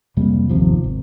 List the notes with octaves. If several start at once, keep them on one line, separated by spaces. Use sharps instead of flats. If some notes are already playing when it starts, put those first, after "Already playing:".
F2 C3 G3 A#3
G1 D#2 C3 F3
G#1